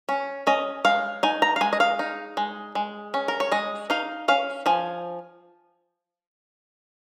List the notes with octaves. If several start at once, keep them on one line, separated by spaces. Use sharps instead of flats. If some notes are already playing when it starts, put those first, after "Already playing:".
C#4
C#4 D#5
G#3 F5
D#4 G#5
A#5
F5
G#3 G#5
D#5
F5
D#4
G#3
G#3
C#4
A#4
C#5
G#3 D#5
D#4 F5
C#4 F5
F3 G#5